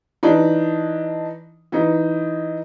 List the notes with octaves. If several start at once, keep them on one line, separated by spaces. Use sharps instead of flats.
E3 D4 D#4
E3 D#4